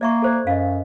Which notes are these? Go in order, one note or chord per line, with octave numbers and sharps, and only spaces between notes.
A#3 D5 E5 C#6
A4 C5 D5
F#2 D#5 F5